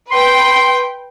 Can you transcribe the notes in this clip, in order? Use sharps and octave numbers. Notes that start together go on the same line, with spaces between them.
B4 G5 C6